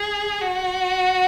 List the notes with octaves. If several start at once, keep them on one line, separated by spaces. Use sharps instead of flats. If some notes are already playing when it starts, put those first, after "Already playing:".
Already playing: G#4
F#4